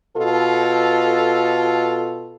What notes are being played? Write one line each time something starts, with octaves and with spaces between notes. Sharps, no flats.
B2 F4 A4